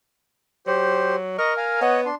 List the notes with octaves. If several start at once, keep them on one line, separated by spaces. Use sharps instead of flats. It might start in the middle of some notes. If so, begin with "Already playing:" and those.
F#3 G4 C5
A#4 D#5 A#5 C#6
F5 G#5 A#5
B3 C#5 D#5 F#5
D4 C6